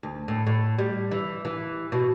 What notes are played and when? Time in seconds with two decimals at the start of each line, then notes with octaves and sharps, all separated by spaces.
0.03 D2
0.28 A2
0.47 A2
0.78 G3
1.11 E3
1.45 E3
1.92 B2